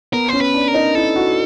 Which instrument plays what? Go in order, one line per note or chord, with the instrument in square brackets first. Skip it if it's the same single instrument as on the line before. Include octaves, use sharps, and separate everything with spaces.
[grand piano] B3 [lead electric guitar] A#4
[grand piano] C#4 [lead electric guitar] C5
[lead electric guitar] B4
[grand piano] D4
[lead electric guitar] A#4
[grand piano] D#4
[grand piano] E4 [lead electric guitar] A4
[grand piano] F#4